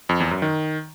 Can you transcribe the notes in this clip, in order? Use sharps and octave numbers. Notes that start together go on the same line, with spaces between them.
F2
E2
F#2
D#3